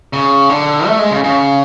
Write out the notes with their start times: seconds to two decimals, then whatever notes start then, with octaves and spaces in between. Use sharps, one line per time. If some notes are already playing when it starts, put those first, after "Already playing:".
0.13 C#3
0.50 D3
0.87 A3
0.99 G#3
1.11 C#3
1.24 C#3